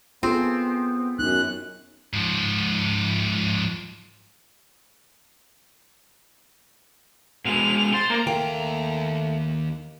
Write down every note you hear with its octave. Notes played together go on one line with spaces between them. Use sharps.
B3 C4 F4 G#4 A4
F#2 B3 D#4 F#6
G#2 F3
B2 G#3 F7
C5 C6 A6
A#3 A#5
D#2 A3 A#3 F#5 G5 A#5